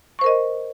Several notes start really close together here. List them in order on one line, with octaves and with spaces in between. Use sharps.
C#6 C5 A#4 D#5